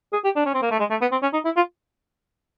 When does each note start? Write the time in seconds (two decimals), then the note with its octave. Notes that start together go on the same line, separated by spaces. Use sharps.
0.13 G#4
0.24 G4
0.36 D4
0.46 C#4
0.54 C4
0.62 A#3
0.71 A3
0.79 G#3
0.90 A3
1.01 B3
1.11 C4
1.22 C#4
1.33 D#4
1.45 E4
1.56 F4